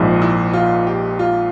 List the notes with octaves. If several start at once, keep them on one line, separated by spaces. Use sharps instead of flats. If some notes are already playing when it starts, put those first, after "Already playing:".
Already playing: A#1 G#2 F3
E4
F4
G4
F4